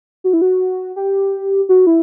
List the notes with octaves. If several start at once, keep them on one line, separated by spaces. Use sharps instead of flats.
F#4
E4
F#4
G4
F#4
E4